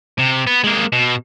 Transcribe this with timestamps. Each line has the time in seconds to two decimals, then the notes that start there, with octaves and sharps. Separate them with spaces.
0.19 C3
0.47 B3
0.64 G#3 A#3
0.92 B2